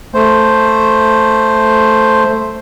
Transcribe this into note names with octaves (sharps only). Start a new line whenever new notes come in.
A3 C5